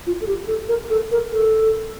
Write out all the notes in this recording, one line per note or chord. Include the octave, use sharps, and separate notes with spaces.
F4
A4
G4
A4
A#4
A4
A#4
A4